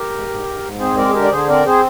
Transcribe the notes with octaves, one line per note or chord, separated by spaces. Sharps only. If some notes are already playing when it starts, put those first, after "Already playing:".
Already playing: G4 A#4
G#2
G#2
G#2
G#2
C4 G#4 C5
G#3 A#4 D5
G#4
D3 G4 A#4
D5
D3 G#4 C5
C4 A#4 D5
C4 G#4 C5